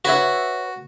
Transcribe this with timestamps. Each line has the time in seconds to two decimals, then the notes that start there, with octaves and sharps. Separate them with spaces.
0.05 F#4 B4 C#5 E5